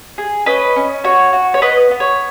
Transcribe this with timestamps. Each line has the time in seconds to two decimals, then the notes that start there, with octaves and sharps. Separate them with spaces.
0.18 G#4
0.46 C#4 B4 D#5
0.76 C#4
1.04 F#4 C#5
1.33 F#4
1.54 C#5
1.62 B3 B4 D#5
1.91 B3
2.00 C#5